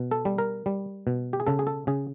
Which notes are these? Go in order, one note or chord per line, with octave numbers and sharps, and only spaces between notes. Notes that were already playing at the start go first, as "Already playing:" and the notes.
Already playing: B2
A4
G3
A#4
G3
B2
G4
G#4
C#3 A4
G#4
A4
C#3 G#4